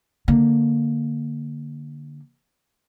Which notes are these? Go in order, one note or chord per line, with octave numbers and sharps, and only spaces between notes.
D3 A#3